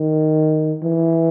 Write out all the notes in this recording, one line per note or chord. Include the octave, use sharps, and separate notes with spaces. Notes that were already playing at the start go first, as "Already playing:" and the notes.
Already playing: D#3
E3